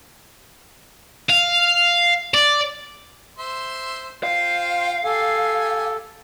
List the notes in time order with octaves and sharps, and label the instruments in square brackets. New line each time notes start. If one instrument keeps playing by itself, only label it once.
[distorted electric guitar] F5
D5
[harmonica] C5 E5 C6
[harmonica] F4 C5 G5 [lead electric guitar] F5
[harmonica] G4 G#5 [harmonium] A4